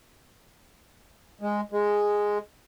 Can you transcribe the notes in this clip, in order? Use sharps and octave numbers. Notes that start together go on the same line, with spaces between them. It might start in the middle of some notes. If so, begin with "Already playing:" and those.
G#3
G#3